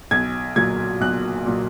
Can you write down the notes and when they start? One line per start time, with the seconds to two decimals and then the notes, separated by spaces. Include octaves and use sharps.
0.11 B1 G#6
0.56 A#2 F#3 G#6
1.01 B1 F#6
1.46 A#2 F#3